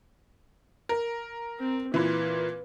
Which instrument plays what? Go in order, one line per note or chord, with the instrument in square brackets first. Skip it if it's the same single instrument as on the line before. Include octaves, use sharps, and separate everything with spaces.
[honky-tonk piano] A#4
[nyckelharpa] C4
[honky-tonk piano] A#2 E3 [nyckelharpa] B4